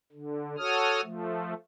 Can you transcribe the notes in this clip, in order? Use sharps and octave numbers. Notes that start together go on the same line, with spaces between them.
D3
F#4 A4 C#5 D#6 F6
F3 A3